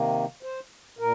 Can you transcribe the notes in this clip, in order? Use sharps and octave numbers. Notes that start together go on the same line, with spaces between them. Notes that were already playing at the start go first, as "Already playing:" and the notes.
Already playing: C3 D#3 A#3
C5
A#2 A#4